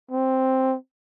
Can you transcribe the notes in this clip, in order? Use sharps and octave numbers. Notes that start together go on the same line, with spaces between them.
C4